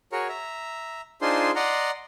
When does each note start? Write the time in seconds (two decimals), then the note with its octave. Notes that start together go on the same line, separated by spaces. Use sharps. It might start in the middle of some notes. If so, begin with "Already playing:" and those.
0.12 F#4 G#4 A#4 C#5
0.29 E5 A#5
1.22 D4 D#4 F4 G#4 C5 C6
1.56 D5 D#5 F#5 A#5 C6